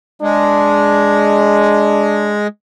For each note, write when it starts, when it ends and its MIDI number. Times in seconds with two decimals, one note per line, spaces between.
0.22 2.47 56
0.22 2.39 62